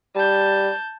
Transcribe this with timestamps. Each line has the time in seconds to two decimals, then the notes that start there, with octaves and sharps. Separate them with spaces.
0.15 G3 A5 G6